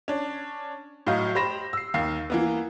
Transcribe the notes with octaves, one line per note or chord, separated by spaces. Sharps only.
C#4 D4
A2 F#3 D#5 F5 G6
G4 C5 B5 A#6 E7
E6 C7
D#2 D#4 F5 C7
E3 A#3 B3